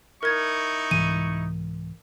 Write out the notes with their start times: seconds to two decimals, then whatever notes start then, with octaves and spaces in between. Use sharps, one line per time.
0.23 D#4 E4 A#4 C#6 G#6
0.91 C2 G#2 E3 D#7